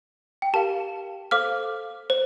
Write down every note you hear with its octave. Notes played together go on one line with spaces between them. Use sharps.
G5
G4 A#4 F5 A5
A4 C5 F5 D6 F6
C5